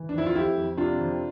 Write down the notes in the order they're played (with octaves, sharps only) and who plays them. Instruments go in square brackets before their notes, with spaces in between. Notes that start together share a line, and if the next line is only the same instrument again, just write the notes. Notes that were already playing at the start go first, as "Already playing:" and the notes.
Already playing: [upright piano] E3
D4
F2 E4
F4
F2 E4 G4
F2
C3 D4 F4
F2